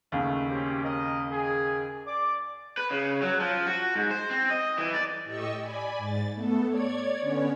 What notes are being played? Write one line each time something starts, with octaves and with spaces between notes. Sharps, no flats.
D#2 C#3 A3
C4 C#4 G4
A#4 D#5
G#4
D5 D6
B4
C#3
F#3
F3
F#4
G#2
C5
C4
D#5
E3
D5
A2 G4 D#5 C#6 E6
D5 G#5 B5
G#2 A6
A3 B3 A4
C#5 D5 G#6
D3 B3 C#4 C#5